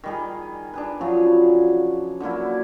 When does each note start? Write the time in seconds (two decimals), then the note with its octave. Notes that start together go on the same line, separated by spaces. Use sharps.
0.04 D#3 G3 G#4
0.74 D4 G#4 B4
1.01 C#3 F3 F#3 D5
2.20 D3 F#3 A#3 E4